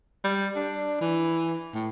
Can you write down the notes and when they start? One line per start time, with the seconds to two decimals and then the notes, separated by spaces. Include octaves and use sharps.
0.25 G3
0.56 D4
1.01 E3
1.75 A2